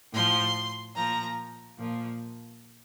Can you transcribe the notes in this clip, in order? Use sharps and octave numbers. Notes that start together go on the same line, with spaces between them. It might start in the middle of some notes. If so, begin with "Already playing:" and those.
A2 F3 C6
A#2 F3 A#5
A#2 F3